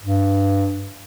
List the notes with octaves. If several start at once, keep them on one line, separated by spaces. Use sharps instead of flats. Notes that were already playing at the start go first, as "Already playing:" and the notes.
G2